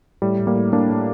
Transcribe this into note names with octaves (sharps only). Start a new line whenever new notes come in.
A2 G3
A2
G3 A#3
A2
A2 A#3 D4
A2